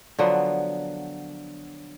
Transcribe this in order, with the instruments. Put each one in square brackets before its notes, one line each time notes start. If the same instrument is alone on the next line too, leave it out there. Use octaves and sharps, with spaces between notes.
[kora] D3 F3 F#3 B3